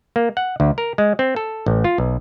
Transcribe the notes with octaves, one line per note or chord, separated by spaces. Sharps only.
A#3
F#5
D2
A#4
G#3
C4
A4
A1
F4
B1